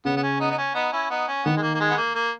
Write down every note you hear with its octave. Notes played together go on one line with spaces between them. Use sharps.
C#3 B3
B3
C#4
B3 D#4
D#4
C#4
B3 D#4
C#4 E4
B3 D#4
C#4
D#3 B3
G#3
A#3
A#3
G#3
B3
A#3
A#3